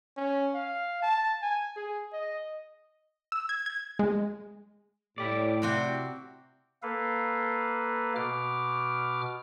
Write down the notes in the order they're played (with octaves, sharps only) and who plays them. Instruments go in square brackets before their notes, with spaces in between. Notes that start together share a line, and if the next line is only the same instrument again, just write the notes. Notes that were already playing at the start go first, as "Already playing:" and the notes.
[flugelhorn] C#4
F5
A5
G#5
G#4
D#5
[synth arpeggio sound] E6
G#6
G#6
G#3
[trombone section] A2 [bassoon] G3 [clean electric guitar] E4 G4 D5
[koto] C3 C4 F#4
[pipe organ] A#3 A4 B4 F5
B2 D6 F6